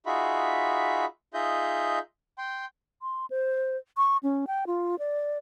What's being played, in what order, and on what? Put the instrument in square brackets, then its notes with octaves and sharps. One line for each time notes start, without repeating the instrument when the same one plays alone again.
[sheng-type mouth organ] D#4 F4 F#4 G#4 E5 B5
D#4 F4 G#4 D#5 E5 G6
G5 C6
[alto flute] C6
C5
C#6
C#4
G5
F4
D5